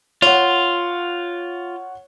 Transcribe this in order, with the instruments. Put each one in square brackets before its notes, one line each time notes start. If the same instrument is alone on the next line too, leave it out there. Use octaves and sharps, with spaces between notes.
[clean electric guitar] F4 [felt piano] C#5 F#5